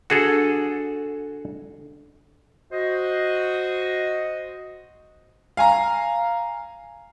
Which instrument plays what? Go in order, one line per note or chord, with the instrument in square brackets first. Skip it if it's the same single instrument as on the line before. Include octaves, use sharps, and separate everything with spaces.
[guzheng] D3 [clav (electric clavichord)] F#4 G#4 A4
[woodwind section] F#4 C5 D#5
[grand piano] F5 G#5 A#5